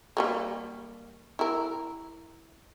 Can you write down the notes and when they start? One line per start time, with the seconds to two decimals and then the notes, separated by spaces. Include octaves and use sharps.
0.17 G3 G#3 A#3
1.39 E4 A#4